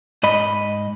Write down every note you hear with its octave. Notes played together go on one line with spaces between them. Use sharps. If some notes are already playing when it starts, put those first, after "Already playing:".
G#2 D#5 B5